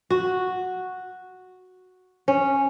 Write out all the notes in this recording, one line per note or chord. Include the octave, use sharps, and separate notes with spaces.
F#4
C#4